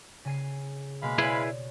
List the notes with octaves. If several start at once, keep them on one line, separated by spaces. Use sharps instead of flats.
C#3 G#5 C7
B2 G#3 A#3 F5 B5
E4 G#4 B4 C#5 D5 A6